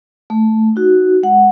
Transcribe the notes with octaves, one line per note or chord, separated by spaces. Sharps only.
A3
D#4 F#4
G#3 F#5